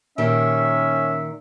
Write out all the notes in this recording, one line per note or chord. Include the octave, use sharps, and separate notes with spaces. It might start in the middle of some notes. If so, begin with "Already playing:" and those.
A#2 D#3 C#4 G4 E5